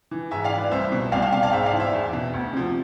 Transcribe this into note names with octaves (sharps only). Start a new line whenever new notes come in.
E3
G#2 E5 G#5
D5 F5
E3
B4 D5
C2 C5 E5
B2
C2 D5 F5
F5 A5
B2 F5 A5
D5 F5
G#2 C5 E5
D5 F5
E3
C5 E5
E2
B2
D2
C3 F3